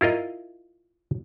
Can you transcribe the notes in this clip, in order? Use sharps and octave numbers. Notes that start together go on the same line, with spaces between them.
E4 F4 A#4 D#5